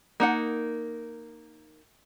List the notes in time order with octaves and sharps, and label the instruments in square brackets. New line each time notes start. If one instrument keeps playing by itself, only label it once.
[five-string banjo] A#3 D#4 F#5